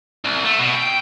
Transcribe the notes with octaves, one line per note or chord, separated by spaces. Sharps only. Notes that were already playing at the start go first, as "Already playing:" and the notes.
C2
A3
B2
G5